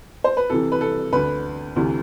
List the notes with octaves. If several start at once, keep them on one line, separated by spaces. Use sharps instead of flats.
C5
B4
C2 C3 E3 A4
B4
A4
D2 D3 B4
D2 C3 E3